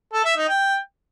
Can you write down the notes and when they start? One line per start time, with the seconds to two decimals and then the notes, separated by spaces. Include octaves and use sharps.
0.13 A4
0.25 E5
0.37 D#4
0.49 G5